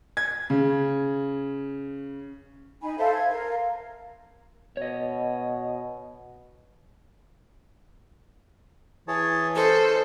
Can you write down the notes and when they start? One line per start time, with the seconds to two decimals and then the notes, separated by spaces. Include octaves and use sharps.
0.17 G#6
0.50 C#3
2.82 D#4 G#5 B5
2.98 A4 C5 E5 F5
3.14 G#6
3.29 A#4 F5
4.77 B2 C#5 D#5
9.08 E3 G#4 C#5 A5
9.56 C#4 A4 C5 D#5 A#5